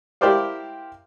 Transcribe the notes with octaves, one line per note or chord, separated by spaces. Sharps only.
E4 G4 A#4 C5 D5 F5